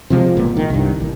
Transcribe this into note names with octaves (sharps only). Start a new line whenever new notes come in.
C3 F3 G3 G#3
G#1 A#2 B3
D#3
C2 G2
A1